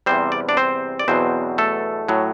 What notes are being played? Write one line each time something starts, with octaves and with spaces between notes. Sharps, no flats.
E2 C3 G3 C4 C5
D5
D4 D5
C4 C5
D5
E2 B2 F#3 C4 C5
A3 A4
A2 F#3